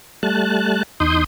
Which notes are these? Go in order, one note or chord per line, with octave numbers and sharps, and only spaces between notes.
G3 A3 A5 F#6
E2 D#4 C6 D#6 G6